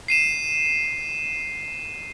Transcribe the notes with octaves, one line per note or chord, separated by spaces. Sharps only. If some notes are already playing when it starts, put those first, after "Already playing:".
C7 D#7 E7